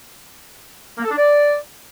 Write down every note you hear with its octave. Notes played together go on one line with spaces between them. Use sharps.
A#3
A4
D4
D5